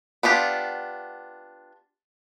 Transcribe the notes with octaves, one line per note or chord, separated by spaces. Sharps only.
B3 D4 F4 G4